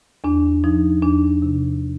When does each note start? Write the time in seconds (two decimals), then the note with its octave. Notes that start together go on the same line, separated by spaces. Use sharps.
0.24 E2 D4
0.64 F3 D#4
1.02 E2 D4
1.42 C3